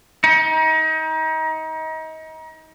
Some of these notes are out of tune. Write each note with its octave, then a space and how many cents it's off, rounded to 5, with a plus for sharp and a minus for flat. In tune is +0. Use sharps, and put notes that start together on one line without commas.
D#4 +30